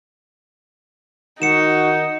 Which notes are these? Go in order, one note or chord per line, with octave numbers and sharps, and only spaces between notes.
D#3 D#4 F#4 C#7 E7